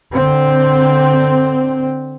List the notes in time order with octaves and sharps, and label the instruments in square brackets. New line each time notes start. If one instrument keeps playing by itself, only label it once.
[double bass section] D3 C4